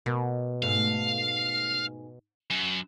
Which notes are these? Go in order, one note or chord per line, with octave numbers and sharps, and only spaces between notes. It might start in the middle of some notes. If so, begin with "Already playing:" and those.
B2 A#3
G#2 A3 F5
F#2